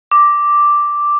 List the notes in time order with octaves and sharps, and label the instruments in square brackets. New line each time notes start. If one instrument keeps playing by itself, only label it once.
[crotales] D6